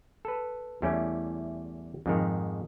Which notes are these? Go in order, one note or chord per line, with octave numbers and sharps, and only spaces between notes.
A4 B4
E2 G3 A3 C#4 E4
F2 G#2 D#3